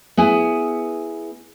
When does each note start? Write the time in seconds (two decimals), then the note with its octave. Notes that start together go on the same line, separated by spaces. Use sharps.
0.17 B3 E4 G#4